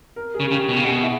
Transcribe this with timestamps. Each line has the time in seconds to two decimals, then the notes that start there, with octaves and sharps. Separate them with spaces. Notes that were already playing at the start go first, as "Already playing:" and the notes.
0.16 A#4
0.35 G#4
0.40 C#3
0.48 G#4
0.51 C#3 G4
0.69 B2
0.76 C#3
0.84 B2 G#4
1.03 E4